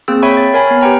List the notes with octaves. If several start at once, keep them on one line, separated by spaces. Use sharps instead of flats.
A#3 C4 G#4 E6
C#5 E5 G5 B5 C#6
A6
A#4 C#5 G#5 B5
B3 F6
G4 B4 G5 A#5